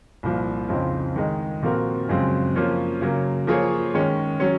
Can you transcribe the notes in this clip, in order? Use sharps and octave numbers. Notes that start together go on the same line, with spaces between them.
C2 A#2 F3
F2 C#3 F3 C4 D#4
D#3 G#3 D#4
A#2 F3 C4 F#4 A#4
F#2 C#3 F3 G#3 C4
F3 A#3 C#4 F4
C#3 F#3 A#3
F3 A#3 F4 G#4 C#5
D#3 G#3 C#4
F#3 C#4